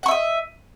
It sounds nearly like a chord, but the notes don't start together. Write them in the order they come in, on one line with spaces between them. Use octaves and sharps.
F#5 C#6 E5 D#5